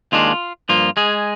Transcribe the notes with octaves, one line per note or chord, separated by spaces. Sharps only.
D#2 D#3 G#3 D4 F4
G2 F3 A#3 F4
G#3 G#4